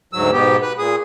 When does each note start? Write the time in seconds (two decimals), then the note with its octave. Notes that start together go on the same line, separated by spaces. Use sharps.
0.13 D2 G#2 F#3 E6
0.32 G#2 B2 B3 G4
0.62 B4
0.78 A#2 G#4 D#6